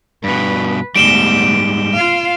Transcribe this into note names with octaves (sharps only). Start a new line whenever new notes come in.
G2 B2 B4
D2 G#2 G3 B3 D7 E7 G7
F4 F5